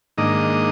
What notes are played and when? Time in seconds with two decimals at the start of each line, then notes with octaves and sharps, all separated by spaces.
0.18 G#2 D#3 A#3 D4 D#5